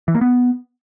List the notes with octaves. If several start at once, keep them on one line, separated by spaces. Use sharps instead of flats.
E3
A#3
B3